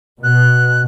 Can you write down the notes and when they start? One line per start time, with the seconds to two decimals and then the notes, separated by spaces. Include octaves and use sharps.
0.23 B2 F#6